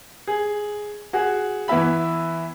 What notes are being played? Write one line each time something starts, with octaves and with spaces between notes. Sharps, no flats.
G#4
F#4 G#4
E3 B3 E4 E5 B5